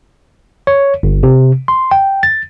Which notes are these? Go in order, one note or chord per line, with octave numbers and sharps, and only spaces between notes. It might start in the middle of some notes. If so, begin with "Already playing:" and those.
C#5
G1
C3
C6
G5
A6